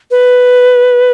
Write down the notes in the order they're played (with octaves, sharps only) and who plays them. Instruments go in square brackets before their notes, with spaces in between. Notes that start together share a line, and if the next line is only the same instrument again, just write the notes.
[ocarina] B4